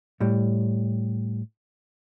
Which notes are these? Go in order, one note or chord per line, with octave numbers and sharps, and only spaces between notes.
A2 G3